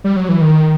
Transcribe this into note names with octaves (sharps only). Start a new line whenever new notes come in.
G3
F#3
E3
D#3